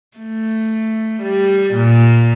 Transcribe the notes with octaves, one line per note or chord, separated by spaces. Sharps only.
A3
G3
A#2